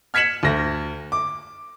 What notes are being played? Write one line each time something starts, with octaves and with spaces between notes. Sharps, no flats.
F6 G#6 B6 C#7 E7 F#7
D2 A#6
D6